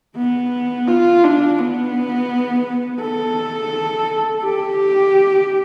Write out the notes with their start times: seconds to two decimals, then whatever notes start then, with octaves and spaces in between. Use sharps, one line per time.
0.16 B3
0.87 F4
1.24 D4
1.58 B3
3.01 A4
4.44 G4